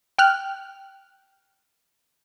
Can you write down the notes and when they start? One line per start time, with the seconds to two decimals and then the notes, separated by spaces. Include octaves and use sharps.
0.18 G5 F6 F#6